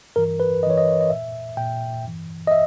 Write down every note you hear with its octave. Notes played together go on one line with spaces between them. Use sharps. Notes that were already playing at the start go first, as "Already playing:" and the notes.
G2 E3 A#4
B4
G2 E3 C#5 D#5
D#5
D#5
A#2 E5
A#2 G5
G2 E3
D#5
E5